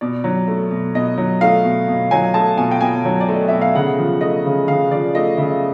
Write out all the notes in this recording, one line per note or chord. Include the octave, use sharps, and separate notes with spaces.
B2 D5
F#3
A3
B2
B2 D#5
F#3
A3 F5
B2
B2
F#3 G#5
A3 A5
B2 G#5
G5
B2 G#5
F#3
D5
A3
D#5
B2 E5
F5
C#3 F#5
F3
A3 D#5
C#3
C#3 F5
F3 D5
A3 D#5
C#3 E5